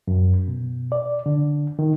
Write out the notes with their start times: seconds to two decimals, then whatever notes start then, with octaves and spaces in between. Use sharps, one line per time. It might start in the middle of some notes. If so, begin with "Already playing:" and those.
0.08 F#2
0.48 B2
0.92 D5
1.26 D3
1.79 D#3